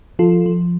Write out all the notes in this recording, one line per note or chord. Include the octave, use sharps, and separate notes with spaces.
F3 F4 A4
F3